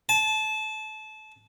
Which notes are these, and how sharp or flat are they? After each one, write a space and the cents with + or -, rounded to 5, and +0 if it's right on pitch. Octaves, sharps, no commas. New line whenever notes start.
A5 -25